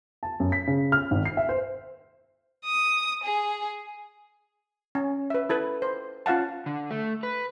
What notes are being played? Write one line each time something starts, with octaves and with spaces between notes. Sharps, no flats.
A5
F#2
B6
C#3
F6
G#1
C7
E5
C5
D#6
G#4
C#4
B4 E5
E4 A4 B4
C5
C#4 F4 F5 F#5 A5
D3
A3
B4